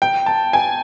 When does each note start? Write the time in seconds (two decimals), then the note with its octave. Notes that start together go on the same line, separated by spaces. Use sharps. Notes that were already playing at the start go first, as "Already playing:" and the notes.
0.02 G5
0.26 A5
0.53 G#5